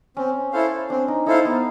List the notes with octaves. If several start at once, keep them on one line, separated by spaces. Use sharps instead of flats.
C4 C#4
E4 A4 C5 F5
C4 D4
D#4
D#4 E4 A4 C5 F5
B3